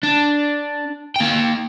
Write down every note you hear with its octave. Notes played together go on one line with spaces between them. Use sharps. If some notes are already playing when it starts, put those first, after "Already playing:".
D4
A#3 G5